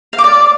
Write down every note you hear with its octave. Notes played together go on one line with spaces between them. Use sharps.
F5
D6
D5